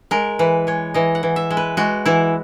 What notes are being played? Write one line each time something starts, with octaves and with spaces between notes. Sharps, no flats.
G#3 A#4
E3 B4
G#3 C#5
E3 D#5
F#5
E3
E5
G#3
B4
G#3 F#4
E3 E4